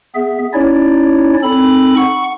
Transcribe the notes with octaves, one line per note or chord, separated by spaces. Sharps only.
B3 G#4 E5
C#4 D#4 E4 C#5 D5
C4 D#4 A4 B5
F#5 C#6